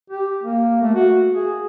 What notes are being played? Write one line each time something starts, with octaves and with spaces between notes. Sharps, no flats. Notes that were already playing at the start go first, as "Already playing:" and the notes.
G4
A#3
A3
F#4
G#4